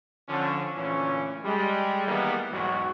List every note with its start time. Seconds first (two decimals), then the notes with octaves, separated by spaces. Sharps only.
0.29 D3 F3 C#4
0.76 D2 A#2 E3 C#4
1.44 G3 G#3
2.07 D#3 E3 G3 G#3 A#3 B3
2.52 B1 E2 G#2 F#3 F#4